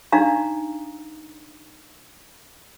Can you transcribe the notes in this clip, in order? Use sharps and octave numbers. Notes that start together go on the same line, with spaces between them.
D4 D#4 F5 A#5